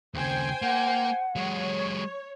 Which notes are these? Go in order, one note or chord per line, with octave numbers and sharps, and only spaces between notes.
D#2 C#3 C5 G5 G#5
A#3 F#5
F#3 G#3 C#5